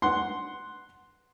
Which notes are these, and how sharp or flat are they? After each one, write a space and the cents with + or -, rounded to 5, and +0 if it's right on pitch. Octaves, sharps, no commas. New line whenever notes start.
B4 +0 F#5 +0 C6 +0